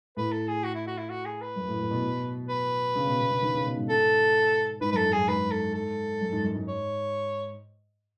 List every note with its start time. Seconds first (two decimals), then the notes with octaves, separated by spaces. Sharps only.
0.17 A2 B4
0.32 A4
0.48 G#4
0.64 F#4
0.75 E4
0.87 F#4
0.98 E4
1.10 F#4
1.25 G#4
1.41 B4
1.56 F#2
1.68 A2
1.80 A2
1.91 B2
2.49 B4
2.96 C#3
3.07 B2
3.19 B2
3.31 C#3
3.42 D#3
3.54 C#3
3.66 B2
3.76 G#2
3.89 G#2 A4
4.81 G#2 B4
4.92 F#2 A4 B4
5.05 G#2
5.13 F#2 G#4
5.28 G#2 B4
5.51 A4
5.74 A4
6.21 F#2
6.32 G#2
6.43 F#2
6.55 G#2
6.68 C#5